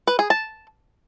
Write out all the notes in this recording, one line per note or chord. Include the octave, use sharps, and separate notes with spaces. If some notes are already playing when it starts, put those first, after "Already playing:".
B4
G#4
A5